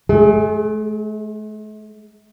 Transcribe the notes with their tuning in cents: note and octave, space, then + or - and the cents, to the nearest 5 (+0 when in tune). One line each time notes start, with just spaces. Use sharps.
A3 -45 G#4 +0